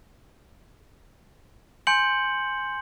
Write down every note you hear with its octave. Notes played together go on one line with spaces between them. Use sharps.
G#5 C6 G6 C#7 F#7